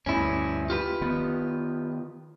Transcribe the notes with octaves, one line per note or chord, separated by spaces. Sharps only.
D2 G2 C#4 E4
F4 G4 B4
D#3 B3